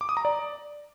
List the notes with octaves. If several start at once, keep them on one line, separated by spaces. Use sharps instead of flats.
D6
D#6
A#5
D5